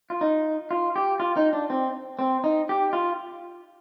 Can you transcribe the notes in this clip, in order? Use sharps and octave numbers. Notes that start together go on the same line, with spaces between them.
F4
D#4
F4
G4
F4
D#4
D4
C4
C4
D#4
G4
F4